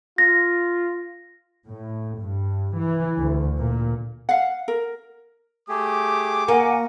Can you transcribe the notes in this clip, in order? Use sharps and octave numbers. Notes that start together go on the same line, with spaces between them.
F4 A#6
A2
G2
E3
D2
A#2
F5 F#5
A#4
A3 G4 G#4 D6
A#3 F#4 A#4 F#5 G#5